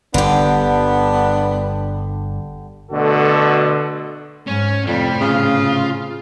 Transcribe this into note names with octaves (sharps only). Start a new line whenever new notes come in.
G1 G2 D3 B3 D4 G4
B2 D3 A3 F#4 A4
G#2 C#4
F2 A2 C3 G3
C#3 F4